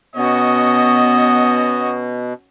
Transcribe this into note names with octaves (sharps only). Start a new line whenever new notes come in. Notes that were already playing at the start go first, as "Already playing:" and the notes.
B2 B3 C#4 F#4 D#5